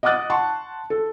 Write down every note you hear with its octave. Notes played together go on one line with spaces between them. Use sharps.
D#5 F#5 D6 D#6 F#6 A6
F#5 A5 C6 C#6
A4